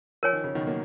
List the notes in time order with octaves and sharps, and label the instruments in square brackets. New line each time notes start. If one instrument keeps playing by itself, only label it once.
[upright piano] F3 [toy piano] A#4 C#5 G#5
[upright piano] D#3
C#3
B2 D#3
F#3 A#3